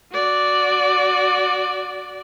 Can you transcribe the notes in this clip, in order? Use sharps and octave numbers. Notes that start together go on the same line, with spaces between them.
F#4 D5